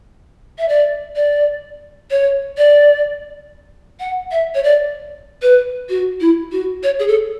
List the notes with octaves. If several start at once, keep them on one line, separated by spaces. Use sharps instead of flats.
E5
D5
D5
C#5
D5
F#5
E5
C#5
D5
B4
F#4
E4
F#4
C#5
G#4
A4